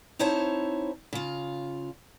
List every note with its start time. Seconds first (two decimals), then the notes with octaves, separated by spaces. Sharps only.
0.19 C4 D#4 E4 C5 C#5 A5
1.13 C#3 F4